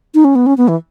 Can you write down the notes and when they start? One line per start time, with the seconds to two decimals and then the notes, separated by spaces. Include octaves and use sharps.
0.14 D#4
0.25 C#4
0.35 B3
0.46 C#4
0.57 B3
0.68 E3